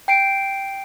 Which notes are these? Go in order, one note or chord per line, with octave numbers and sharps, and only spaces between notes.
G5 C7 D7